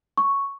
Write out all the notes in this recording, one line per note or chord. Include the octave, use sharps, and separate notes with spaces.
C#6